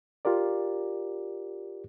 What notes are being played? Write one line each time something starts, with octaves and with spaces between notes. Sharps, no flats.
F4 G4 A#4 D5